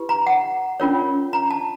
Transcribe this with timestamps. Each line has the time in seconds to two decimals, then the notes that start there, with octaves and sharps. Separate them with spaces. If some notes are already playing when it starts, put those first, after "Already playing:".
Already playing: E4 G4 B4
0.09 A#5
0.27 F#5
0.80 C#4 F4 A#4 C#5
1.33 A#5
1.51 A5